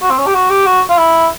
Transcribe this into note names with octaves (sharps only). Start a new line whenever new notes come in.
F#4
C4
C#4
G4
F#4
G4
F#4
F4
E4